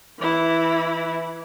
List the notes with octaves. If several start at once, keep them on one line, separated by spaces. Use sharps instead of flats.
E3 E4